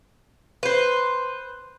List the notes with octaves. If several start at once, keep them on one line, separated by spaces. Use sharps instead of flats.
B4 C5